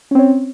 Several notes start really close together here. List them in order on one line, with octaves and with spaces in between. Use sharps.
C#4 C4 C#5